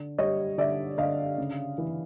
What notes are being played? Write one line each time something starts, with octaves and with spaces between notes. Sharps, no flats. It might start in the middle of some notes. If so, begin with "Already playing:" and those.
Already playing: D3
G3 C#5 D#5
D3 D5 E5
D3 D#5 F5
C#3
E3